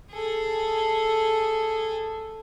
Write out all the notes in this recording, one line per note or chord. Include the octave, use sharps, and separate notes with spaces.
G#4 A4